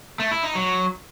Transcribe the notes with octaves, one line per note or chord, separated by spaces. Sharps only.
A3
E4
D#4
F#3